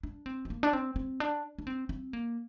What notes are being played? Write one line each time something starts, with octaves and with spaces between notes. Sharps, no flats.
D4
C4
G#3
A#3
D4
C4
C4
D4
D4
C4
C4
A#3